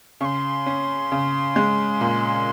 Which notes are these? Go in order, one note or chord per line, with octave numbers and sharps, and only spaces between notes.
C#3 C6 C#6
C#4
C#3
G#3
A#2